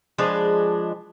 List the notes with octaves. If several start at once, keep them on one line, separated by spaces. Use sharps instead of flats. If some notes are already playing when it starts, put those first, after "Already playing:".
F3 G#3 D4 B4